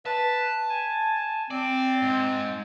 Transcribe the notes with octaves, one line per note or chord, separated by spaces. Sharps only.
B4 A5
G#5
C4 D5
G#2